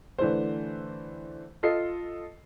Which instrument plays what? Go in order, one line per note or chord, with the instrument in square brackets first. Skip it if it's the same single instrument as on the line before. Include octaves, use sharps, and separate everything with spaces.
[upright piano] D3 E3 A3 C5
F4 A4 D#5 C7